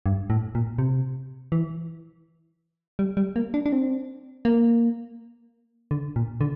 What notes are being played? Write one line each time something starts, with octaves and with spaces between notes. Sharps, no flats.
G2
A2
A#2
C3
E3
G3
G3
A#3
D4
D4
C4
A#3
D3
A#2
D3